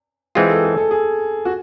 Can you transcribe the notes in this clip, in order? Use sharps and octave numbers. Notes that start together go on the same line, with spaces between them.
E3 G#3 C4 F4 G#4
A4
G#4
A4
G#4
F#4